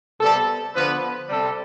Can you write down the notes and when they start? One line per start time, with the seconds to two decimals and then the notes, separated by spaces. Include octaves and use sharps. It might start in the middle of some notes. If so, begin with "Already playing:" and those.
0.20 C3 G3 B3 A4
0.74 D3 F3 B3 B4
1.29 C3 G3 C4 A4